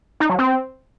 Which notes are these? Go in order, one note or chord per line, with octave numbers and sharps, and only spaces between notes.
D#4
F#3
C4